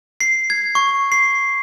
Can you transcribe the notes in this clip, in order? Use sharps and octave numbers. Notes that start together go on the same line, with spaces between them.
C7
G#6
C#6
C7